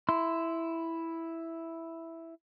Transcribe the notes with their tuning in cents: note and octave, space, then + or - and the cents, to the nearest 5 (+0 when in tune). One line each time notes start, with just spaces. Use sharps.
E4 +0 C6 -20